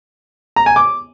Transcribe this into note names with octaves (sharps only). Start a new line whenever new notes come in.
A#5
G#5
D6